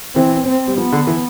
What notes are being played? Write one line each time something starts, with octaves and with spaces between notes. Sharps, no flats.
E3 C4
C4
G3
F3 B3
D3
E3